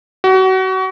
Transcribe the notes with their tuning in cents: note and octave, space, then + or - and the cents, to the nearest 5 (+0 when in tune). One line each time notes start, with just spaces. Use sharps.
F#4 +30